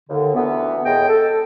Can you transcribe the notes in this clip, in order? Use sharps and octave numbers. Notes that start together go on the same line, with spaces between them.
D#2 D3
D2 E3 B3
D#2 A2 G#3 G#4 D#5 G5
A4